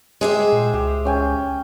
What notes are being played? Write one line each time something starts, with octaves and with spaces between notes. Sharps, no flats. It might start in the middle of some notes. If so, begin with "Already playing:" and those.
G#3 G4 G#4 C5 E5
A#2
C#2 G4
C#4 G5 G#5